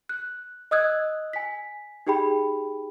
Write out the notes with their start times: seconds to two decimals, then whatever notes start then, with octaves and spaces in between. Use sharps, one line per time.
0.09 F#6
0.71 D#5 D#6 E6 F#6 G#6
1.33 G#5 B6
2.07 D#4 G4 G#4 G5 B5